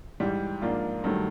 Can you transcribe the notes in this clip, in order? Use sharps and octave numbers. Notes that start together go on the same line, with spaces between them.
G#2 E3 G3
G#2 F3 A#3 D4 F4
G2 D#3 F#3 A3